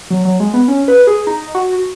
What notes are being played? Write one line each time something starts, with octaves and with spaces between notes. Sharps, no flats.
F#3
F#3
G#3
B3
C#4
B4
G#4
D#4
F#4